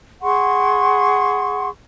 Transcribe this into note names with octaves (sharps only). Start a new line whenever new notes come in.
G#4 F#5 C6 C#6